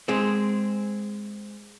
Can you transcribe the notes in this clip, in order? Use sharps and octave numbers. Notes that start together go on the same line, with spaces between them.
G#3 C4